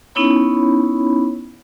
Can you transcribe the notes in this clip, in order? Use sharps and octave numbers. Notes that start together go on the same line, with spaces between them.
B3 C#4 D#4 E4 C#5 B5